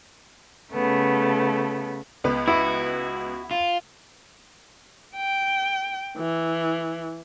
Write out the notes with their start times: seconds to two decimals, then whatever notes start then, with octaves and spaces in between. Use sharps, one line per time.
0.72 C#3 A3 B3
2.24 C#2 B3 B4
2.48 E4 F#4
3.51 F4
5.16 G5
6.17 E3